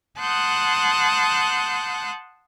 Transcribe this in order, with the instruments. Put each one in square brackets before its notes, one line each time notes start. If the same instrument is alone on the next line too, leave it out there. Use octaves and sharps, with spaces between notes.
[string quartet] F#5 A5 C6 D#6 F#6 G6